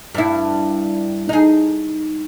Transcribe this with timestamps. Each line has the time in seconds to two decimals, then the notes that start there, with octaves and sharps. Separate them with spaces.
0.15 G2 E4
1.29 D#4 G#4